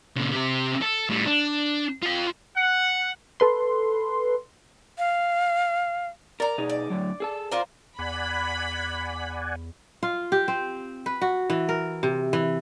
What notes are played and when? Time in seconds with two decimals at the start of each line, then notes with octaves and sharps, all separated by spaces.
0.16 A#2 C#3
0.33 C3 G4
0.82 A4
1.10 A2 G3
1.26 D4
2.02 F4 G5
2.56 F#5
3.40 A4 B4 C6
4.98 F5
6.40 A#4 D5 A#5
6.58 B2 D#4 G#4
6.69 D5
6.90 A2 D3 F#3
7.20 G#4 A4 A5
7.51 F4 A#4 C5 D5
7.99 E2 D5 F#5 G#5 B5
10.03 F4
10.32 G4
10.48 C4
11.06 B4
11.22 F#4
11.50 E3
11.69 A#4
12.03 C3
12.33 E3